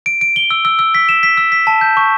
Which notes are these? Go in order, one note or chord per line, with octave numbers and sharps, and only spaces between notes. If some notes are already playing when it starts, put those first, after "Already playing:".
D7
D7
G7
E6
E6
E6
B6
E7
B6
E6
B6
A5
G6
C#6